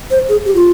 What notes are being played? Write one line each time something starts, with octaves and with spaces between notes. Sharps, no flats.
C5
G#4
G4
F4